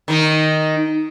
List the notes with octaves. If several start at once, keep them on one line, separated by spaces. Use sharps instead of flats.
D#3 D#4